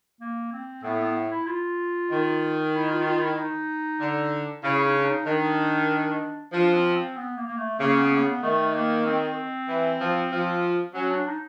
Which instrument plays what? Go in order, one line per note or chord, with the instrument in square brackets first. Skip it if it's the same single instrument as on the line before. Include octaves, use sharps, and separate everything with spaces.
[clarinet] A#3
C4
[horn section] A2 [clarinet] B3
[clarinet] B3
E4
F4
[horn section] D#3
[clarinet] E4
F4
F4
E4
D#4
[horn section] D3
[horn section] C#3 [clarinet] E4
[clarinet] D#4
D4
D#4
[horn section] D#3 [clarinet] D4
[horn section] F3 [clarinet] D4
[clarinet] C4
C4
B3
A#3
A#3
A3
[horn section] C#3 [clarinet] A#3
[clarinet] B3
A#3
B3
[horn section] D#3 [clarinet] A3
[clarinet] A#3
C4
[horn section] E3
F3
F3
[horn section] F#3 [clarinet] C#4
[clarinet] D4
D#4